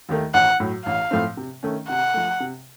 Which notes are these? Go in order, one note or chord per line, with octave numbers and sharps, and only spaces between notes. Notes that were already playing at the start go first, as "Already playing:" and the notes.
D#2 D#3 A3
A1 F#5
A2 F#3
A1 F5
A2 F3 A3 C4
C3
D#3 A3 C#4
C3 F#5
F3 A3
C3